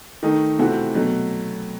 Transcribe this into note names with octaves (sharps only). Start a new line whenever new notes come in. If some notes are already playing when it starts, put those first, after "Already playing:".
D#3 A3 D#4
C3 E3 A3 C4 F#4
B2 F#3 A3